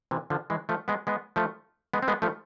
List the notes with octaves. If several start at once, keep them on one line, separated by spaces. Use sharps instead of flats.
C3 E3
D3 F3
E3 G#3
F3 A3
G#3 B3
G#3 B3
F3 A3
G#3 B3
C4
G#3 B3
F3 A3